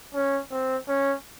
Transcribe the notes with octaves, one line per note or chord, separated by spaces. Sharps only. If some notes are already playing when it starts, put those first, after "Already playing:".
C#4
C4
C#4